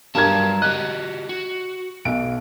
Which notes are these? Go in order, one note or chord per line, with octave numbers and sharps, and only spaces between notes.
G2 F#3 G3 A#4 A5 G#6
F#4 G4 D#5 F#6
F#4
B1 B2 D7